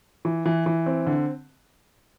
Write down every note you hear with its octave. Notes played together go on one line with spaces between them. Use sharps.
E3
E3
E3
C4
D3